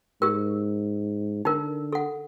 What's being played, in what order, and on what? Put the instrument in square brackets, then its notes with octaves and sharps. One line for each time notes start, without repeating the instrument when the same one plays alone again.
[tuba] G#2 [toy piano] G4 A#4
[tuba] D3 [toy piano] D#4 A#4
[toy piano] A4 F#5